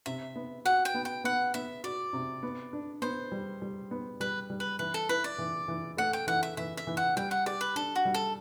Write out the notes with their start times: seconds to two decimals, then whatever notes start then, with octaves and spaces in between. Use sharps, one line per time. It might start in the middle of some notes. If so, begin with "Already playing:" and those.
0.06 C3 E5
0.36 B3
0.65 F#4 F#5
0.85 G5
0.95 B3
1.05 G5
1.24 B3 F#5
1.54 B3 E5
1.84 F#4 D5
2.13 C3
2.43 B3
2.73 D4
3.02 B3 C5
3.32 G3
3.62 G3
3.91 B3
4.20 G3 B4
4.50 G3
4.60 B4
4.79 E3 B4
4.94 A4
5.09 E4 B4
5.24 D5
5.39 E3
5.68 E3
5.97 A3 F#5
6.13 G5
6.27 E3 F#5
6.43 E5
6.57 E3 E5
6.77 E5
6.87 E3
6.97 F#5
7.16 G3 G5
7.31 F#5
7.46 G4 D5
7.61 B4
7.76 D4 A4
7.96 F#4
8.05 G3
8.14 A4